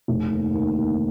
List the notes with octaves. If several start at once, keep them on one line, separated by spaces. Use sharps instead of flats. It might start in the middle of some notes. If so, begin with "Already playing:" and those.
F1
D#2
D#2
D#2